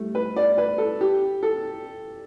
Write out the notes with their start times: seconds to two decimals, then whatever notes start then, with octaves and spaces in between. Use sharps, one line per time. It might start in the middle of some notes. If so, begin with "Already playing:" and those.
Already playing: G3 A3
0.15 B4
0.36 D5
0.58 B4
0.78 A4
1.01 G4
1.43 A4